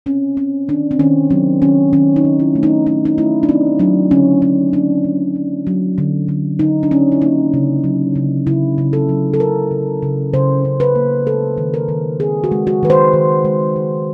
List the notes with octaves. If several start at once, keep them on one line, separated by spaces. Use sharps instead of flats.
C4 C#4
C4 C#4
D#3 D4
C4
D#3 C#4
F#3 C4
D#3 C#4
D#3 C#4
D#4
D#3
E4
A3
D#4
A3 D#4
D#4
A3 E4
D4
C4 D#4
F#3 D4
D3 C#4
D3 C#4
A#3 D4
D3
F#3
F#3
D3
D3
D3 D#4
D4
D3 C#4
E4
A#3 D#4
C#3
F#3
C#3
C#3 E4
C#3
A4
F#3
A4
C#3 A#4
C#3
C#3
C#3 C5
C#3
B4
A#3
G#3 A4
D#3
A#4
D#3
C4 G#4
F#4
G#3
F#4
D#3 B4
C5
D#3
G#3
G#3